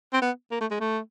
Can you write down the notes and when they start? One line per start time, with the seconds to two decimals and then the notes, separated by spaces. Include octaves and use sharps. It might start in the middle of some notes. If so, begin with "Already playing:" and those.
0.13 C4
0.22 B3
0.51 A#3
0.61 A3
0.71 G#3
0.80 A3